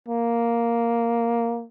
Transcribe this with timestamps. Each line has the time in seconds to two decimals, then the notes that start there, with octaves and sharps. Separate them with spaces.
0.09 A#3